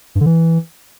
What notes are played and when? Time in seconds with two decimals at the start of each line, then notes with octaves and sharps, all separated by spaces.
0.15 G2
0.21 D3
0.26 E3